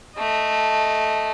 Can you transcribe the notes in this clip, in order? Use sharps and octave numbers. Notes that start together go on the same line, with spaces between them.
A3 D#5